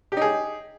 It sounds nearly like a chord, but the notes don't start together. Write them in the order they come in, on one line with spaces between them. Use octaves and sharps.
G4 D#4 G#4